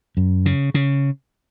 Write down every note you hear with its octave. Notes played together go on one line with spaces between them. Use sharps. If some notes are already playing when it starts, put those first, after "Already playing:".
F#2
C#3
C#3